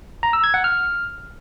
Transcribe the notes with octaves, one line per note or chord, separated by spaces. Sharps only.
A#5
E6
G#6
F#5
F6